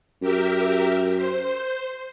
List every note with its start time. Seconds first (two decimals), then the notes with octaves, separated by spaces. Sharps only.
0.22 F#2 G4 A#4 E5
1.16 C5